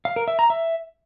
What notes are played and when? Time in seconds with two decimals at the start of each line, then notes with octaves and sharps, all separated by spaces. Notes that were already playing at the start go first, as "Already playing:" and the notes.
0.05 F5
0.16 A#4
0.28 E5
0.39 A#5
0.50 E5